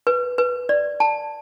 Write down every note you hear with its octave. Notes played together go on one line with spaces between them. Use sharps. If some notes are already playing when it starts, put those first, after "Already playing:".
B4
B4
D5
A5